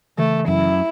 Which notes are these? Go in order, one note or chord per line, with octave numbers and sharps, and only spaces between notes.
C#3 E3 A3
F#2 E4